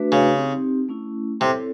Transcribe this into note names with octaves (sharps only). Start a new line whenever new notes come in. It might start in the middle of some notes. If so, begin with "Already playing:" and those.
Already playing: A3 D4 F#4 B4 E5
C#3
C4 D#4 G4
A3 C#4 E4
C3 C4 E4 A4 C#5